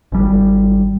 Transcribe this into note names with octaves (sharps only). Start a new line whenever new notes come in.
G#1 G3